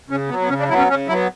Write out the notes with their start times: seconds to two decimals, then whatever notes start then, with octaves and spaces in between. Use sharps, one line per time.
0.10 C#3 C#4
0.29 B3
0.31 F#3
0.41 B3
0.49 C#3 C#4
0.59 D4
0.69 F#3 E4
0.72 B3
0.78 C#4
0.88 C#3 C#4
1.08 F#3 B3 E4